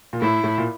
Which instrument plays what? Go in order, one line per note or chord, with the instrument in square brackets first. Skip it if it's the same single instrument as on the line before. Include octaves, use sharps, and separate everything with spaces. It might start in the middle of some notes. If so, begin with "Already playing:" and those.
[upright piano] A#2
[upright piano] A2 [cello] E4
[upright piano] A2
A#2